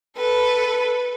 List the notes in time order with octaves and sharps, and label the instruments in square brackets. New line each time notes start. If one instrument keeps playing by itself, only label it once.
[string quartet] A4 B4